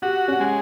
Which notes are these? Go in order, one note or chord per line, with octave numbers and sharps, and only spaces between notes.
F#4 G4
C#4
G#3